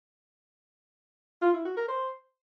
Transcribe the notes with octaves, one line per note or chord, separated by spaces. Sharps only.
F4
E4
F#4
A#4
C5